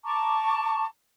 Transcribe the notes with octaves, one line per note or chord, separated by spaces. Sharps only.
A5 A#5 C#6 D6